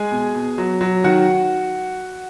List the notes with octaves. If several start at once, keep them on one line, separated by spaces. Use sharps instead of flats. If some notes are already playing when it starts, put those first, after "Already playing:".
Already playing: G#3 G#4 G#5
B2
B2
F#3
F#3
D#3 F#4 F#5